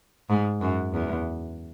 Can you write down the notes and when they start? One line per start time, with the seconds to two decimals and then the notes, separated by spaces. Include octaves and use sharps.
0.29 G#2
0.61 F#2
0.93 E2